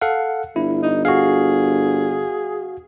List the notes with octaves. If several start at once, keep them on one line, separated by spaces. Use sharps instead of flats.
A4 F5 F#5
G1 E4
D#4
F#4 G#4 F5